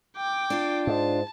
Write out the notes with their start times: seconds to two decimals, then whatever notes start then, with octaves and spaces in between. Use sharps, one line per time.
0.17 G5 D6
0.50 D4 F4
0.87 G#2 A5